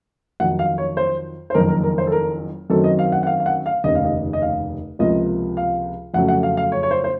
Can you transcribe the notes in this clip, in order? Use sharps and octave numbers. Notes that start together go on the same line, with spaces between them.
F2 D#3 F#3 F#5
F5
C#5
C5
C5
F#1 F2 D#3 A#3 A#4
A#4
A#4
C5
A4
A#4
F#2 D#3 F#3 C4 A4
D#5
F5
F#5
F#5
F5
F5
F#5
F5
F1 D#2 C#3 D#5
F5
D#5
D#5
F5
C#2 C3 F3 A#3 D#5
F5
F2 C#3 F#3 A3 F#5
F#5
F5
F5
C#5
C#5
C5
C5